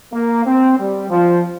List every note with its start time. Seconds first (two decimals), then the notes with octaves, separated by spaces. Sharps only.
0.13 A#3
0.45 C4
0.78 G3
1.10 F3